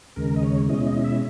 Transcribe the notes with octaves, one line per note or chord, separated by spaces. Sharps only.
D#2 C#3 G#3 A#4
D#5
C#5
B2 G#3 C#4 E4 D#5
D#5
E5